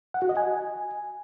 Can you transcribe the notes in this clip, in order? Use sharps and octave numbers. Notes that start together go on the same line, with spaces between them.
F#5
F#4
D#5
G#5